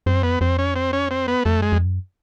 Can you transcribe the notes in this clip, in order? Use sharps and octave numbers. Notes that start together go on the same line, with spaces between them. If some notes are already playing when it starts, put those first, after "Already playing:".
F#2 C4
F2 B3
F2 C4
C#4
C4
C#4
C4
B3
F2 A3
F#2 G#3
F2
F#2